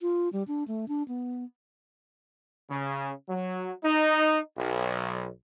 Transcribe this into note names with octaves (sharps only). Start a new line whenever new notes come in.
F4
G3
D4
A3
D4
B3
C#3
F#3
D#4
B1